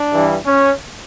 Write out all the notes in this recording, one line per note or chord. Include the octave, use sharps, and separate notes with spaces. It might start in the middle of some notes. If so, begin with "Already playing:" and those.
Already playing: D4
G2 E3 G3
C#4